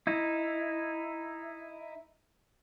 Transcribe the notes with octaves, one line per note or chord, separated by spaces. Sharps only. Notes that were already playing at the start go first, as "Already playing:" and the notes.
D#4 E4